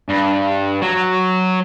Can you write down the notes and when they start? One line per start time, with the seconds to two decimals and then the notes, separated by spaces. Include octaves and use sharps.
0.09 G2
0.82 F#3